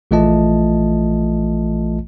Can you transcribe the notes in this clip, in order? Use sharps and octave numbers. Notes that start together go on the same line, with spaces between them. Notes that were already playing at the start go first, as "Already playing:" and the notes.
A#1 E3 A3 F4 D#5 A5